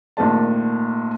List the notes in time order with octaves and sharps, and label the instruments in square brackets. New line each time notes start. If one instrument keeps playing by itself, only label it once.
[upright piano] G#1 A#2 D#3 A3 D4 A5